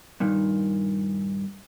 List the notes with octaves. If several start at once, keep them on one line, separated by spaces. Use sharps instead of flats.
G2 A#2 D#3